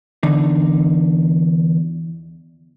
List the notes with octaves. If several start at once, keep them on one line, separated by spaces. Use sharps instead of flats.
E2 D3 D#4